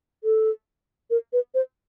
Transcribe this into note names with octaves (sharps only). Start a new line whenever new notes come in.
A4
A#4
B4
C5